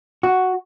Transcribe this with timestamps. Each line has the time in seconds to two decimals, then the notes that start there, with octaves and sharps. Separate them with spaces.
0.23 F#4